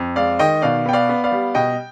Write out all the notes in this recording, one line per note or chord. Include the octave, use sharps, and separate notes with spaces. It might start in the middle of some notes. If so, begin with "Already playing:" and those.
Already playing: F2
G#3 D5 F5
D#3 D#5 G5
B2 D5 F5
B3 G5
D5 F5
B3
D5 F5
G3
B2 D#5 G5